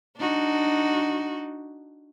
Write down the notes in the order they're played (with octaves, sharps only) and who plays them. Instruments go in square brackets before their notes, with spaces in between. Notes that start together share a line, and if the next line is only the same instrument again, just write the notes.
[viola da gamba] D4 D#4 F#4